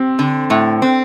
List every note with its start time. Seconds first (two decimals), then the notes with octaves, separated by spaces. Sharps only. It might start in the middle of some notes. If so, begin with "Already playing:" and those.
Already playing: C4 G4
0.19 D3
0.50 A2
0.82 C4